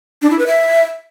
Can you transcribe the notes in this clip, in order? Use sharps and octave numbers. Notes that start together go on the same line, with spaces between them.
D4
E4
B4
E5